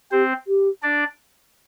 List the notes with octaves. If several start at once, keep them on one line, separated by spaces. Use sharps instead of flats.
C4 G4 C5
G4
D4 D5